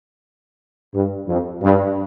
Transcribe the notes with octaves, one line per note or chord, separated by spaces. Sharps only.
G2
F2
G2